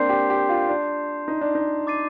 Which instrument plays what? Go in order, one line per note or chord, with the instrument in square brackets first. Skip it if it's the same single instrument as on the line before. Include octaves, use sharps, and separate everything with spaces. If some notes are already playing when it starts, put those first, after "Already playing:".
Already playing: [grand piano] A#3 C4 D4 [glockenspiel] C6 G6 C7
[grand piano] G4
G4
F4
D4
D#4
D4
D#4
[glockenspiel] D6 A6 C7 D#7